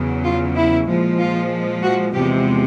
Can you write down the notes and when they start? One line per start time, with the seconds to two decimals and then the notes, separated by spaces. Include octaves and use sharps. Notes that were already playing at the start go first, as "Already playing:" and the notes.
Already playing: E2 C#3 F#3
0.25 F4
0.56 E4
0.87 A#2 F3 G#3
1.19 F4
1.82 F#4
2.13 E2 C3 F3 G#3 G4